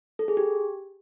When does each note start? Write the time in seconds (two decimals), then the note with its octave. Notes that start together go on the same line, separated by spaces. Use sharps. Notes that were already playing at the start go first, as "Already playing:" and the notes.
0.19 A4
0.28 G#4
0.37 G4